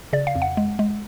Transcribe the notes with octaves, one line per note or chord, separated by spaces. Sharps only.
C#3 D5
F5
F2
F#5
G#3
G#3